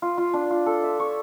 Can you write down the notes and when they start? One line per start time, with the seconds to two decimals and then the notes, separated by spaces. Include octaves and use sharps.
0.02 F4
0.18 F4
0.34 D4
0.51 F4
0.66 A4
0.83 E5
1.00 C#5